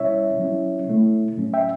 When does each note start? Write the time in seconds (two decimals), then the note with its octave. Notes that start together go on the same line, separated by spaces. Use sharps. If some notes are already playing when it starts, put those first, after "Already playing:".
Already playing: B2 G3 C#4 E4 C#5 E5
0.39 F#3 C#4 E4
0.88 B2 A3 E4
1.37 A2 F#3 C#4
1.54 E5 G5